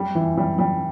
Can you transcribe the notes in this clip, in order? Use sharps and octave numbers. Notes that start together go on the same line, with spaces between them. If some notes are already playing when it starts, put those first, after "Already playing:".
Already playing: G3
E3
G3
G3